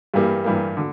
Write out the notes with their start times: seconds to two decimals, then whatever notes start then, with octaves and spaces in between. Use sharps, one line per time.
0.14 G2 E3 G3 A#3
0.44 G2 E3 G3 A#3
0.77 D3